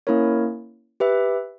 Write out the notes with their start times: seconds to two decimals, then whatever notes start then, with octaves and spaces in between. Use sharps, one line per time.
0.07 A#3 C#4 E4 A#4 C#5
1.00 G4 B4 E5